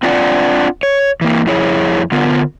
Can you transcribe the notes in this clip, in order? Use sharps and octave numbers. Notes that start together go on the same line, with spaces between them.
C4 D4 F4 D5 F#5
C#5
E3 A#3
F2 E4 G#4 C#5
D3 B3 F4 A#4